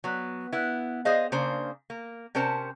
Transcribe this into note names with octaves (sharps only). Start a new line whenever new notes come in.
F#3 B3
B3 E4
G#4 C5 D#5 F5
C#3 A#3 D4 C5
A#3
C3 C#4 A#4 C5 A5